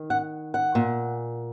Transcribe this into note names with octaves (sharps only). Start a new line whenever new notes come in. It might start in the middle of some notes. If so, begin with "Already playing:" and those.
Already playing: D#3
F#5
F#5
A#2